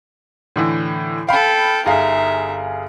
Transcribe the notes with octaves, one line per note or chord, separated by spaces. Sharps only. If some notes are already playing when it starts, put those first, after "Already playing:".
A2 D3 E3
A4 F5 G5 B5
G1 D#4 G#4 E5 F5